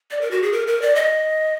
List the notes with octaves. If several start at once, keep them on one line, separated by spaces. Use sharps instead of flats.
D5
A#4
F#4
G#4
A#4
A#4
D5
D#5